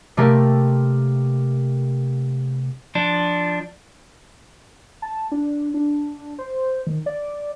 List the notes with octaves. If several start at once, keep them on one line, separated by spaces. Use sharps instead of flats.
C3 A3 A#3 G4 A#4
F3 D4
A5
D4
D4
C5
D#3
D5